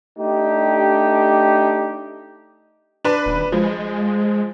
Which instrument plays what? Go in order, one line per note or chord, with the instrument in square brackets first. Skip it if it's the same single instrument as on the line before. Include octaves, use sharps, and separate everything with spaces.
[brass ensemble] A3 D4 D#4 G4
[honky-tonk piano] D4 B4 B5
[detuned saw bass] D#1
[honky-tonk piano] F3 [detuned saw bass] G#3